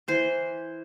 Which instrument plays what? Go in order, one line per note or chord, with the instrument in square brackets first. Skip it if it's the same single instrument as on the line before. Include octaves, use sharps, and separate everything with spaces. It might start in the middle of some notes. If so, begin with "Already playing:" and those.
[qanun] E3 C5 C6